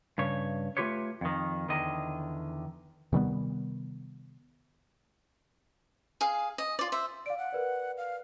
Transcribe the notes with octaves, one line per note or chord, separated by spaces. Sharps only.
G2 C#3 C#5
A3 A#3 F4 G4 B4 C#5
F2 D#3
E2 D3 D#3 D#5
C3 D#3 G3 B3
G#4 F5
D#5
F4 D5
C5 E5
D5 F5 D7
F#5
A#4 B4 D5
F5